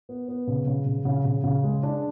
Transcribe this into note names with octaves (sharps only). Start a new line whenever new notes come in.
B3
B3
C#3
C#3
C#3
C#3
C#3
C#3
G#3
D4